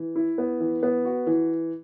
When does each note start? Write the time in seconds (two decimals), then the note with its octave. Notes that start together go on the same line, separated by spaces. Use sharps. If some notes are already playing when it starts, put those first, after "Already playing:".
Already playing: E3
0.16 E4
0.38 B3
0.60 E3
0.83 B3
1.05 F#4
1.27 E3